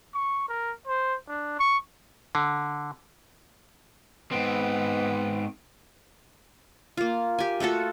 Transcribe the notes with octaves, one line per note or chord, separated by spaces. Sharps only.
C#6
A#4
C5
D4
C#6
D3
G#2 B3 C4
A#3 F4
G4 G#5
A3 F4 F#4 A4